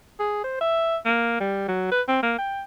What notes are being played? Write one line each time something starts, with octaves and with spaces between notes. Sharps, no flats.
G#4
C5
E5
A#3
G3
F#3
B4
C4
A#3
G5